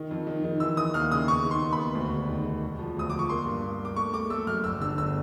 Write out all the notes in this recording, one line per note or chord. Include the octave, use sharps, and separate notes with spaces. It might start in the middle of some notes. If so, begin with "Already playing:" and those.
Already playing: D#3
F2
D#3
D#3
E3 E6
E3 D#6
D#2 F6
C#3 D#6
B3 C#6
D#3
C6
D#2
B5
B3
D2
E1
D#3
E1
E1
F3
D2 D#6
F3 D6
C#6
A#3 C6
G2
A#3
A#3
D6
A3 C#6
A3 D6
A3 E6
F#2 F6
G1 E6
D3 E6
G1 E6